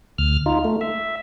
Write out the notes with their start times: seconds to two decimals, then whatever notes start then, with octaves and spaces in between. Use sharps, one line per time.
0.18 D2 F6
0.46 D#4 F4
0.65 A3
0.81 E5